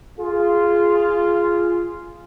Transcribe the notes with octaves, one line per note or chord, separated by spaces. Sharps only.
F4 G#4